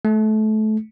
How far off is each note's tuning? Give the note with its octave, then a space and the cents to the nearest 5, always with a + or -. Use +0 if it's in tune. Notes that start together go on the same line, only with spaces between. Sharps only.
A3 -25